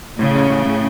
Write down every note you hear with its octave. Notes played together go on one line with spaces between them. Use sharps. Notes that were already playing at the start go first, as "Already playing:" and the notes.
A2 C#3
C#4
A2
A2